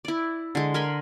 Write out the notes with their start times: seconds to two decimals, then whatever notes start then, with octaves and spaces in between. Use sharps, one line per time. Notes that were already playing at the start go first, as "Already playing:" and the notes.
0.05 E4 D5
0.55 D3 G#3
0.74 A#4 G#5 B5 C6